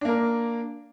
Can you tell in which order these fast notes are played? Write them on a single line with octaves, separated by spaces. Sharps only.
D4 A#3 A#4